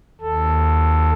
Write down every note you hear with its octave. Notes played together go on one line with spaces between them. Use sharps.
D#2 A4